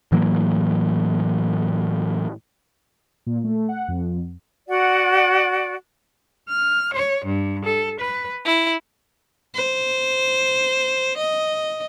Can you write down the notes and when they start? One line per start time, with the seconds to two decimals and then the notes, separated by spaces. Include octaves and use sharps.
0.12 A2 E3 F#3 A#3
3.26 A#2
3.44 A3
3.69 F#5
3.88 F2
4.68 F#4 D5 F#5
6.48 F6
6.94 C#5
7.25 G2
7.63 A4
7.99 B4
8.44 E4
9.55 C5
11.18 D#5